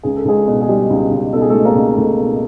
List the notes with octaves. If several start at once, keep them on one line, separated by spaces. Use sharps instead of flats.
C#2 G#4
A4
C#2 G#3 G#4
B2
G#4
G3 G#3 G4
C#2
C#2
B2 A4
G#4
G#3 A3 A4
A#3 A#4
C#2
C#2 A3 A4
B2